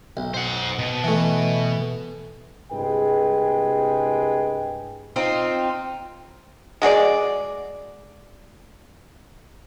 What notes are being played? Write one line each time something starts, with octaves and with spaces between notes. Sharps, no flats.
B1
C5 F#5
B2
E3 A3
C2 G2 G#3 G#4 B4 G5
C4 D#4 F4
G#3 F#4 G#4 D5